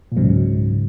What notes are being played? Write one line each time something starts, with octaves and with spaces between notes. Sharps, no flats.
A#2
C#2 G#2 C#3 F#3